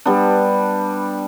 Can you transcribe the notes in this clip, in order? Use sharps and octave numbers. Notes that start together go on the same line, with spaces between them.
G3 B3 D4